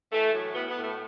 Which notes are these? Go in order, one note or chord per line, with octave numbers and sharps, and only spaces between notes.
E3 A3
A2 F#3
A2 B3
B3
A2
A3